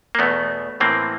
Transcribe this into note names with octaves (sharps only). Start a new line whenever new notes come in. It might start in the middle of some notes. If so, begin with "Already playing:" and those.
A#3
E2 B2 A3 B3
A2 E3 A#3 C4